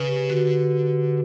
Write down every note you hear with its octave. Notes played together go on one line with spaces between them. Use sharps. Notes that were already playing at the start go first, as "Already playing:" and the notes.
Already playing: C#3 B4
G4
D3 F#4